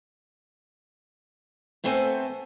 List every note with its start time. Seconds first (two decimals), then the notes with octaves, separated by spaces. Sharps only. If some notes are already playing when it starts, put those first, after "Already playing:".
1.84 A3 B3 C4 A4 C5 G#5